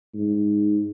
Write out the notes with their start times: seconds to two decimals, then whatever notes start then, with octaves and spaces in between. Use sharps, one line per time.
0.14 G#2